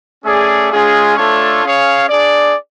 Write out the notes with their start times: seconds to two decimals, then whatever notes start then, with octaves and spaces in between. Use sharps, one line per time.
0.23 A3 C#4 G#4 D5
0.70 G#3 C#4 F4 G#4
1.17 A3 D4 F4 A4 C#5
1.63 C#4 G#4 C#5 F5
2.09 D4 G#4 D5